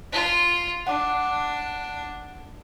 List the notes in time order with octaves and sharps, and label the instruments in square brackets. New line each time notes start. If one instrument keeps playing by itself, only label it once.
[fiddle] F4
[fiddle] D4 [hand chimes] F#5 D6